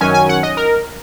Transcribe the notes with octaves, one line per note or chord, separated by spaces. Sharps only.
F#2 D#3 F#3 C#4 G#5
G#5
F#5
D#5
A#4